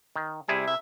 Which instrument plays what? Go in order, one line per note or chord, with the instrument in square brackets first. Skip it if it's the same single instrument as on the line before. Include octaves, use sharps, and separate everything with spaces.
[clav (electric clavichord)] D#3
[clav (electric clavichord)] C3 E4 G#4 [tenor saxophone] G3
[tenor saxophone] E5